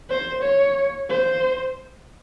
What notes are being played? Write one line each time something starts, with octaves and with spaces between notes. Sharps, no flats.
C5
C#5
C5